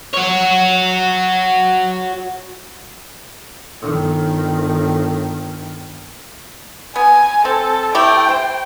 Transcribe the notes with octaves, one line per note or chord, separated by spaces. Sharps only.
F#4 C#5
G1 D#3
B3 G#5
C4 A4
A3 E4 G4 G5
C5